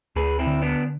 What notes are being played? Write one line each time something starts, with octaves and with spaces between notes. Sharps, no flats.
D2 G#4 B4
C4 E4
D3
B3 D4